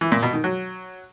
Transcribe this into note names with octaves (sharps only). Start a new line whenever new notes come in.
E3
A#2
B2
D#3
F#3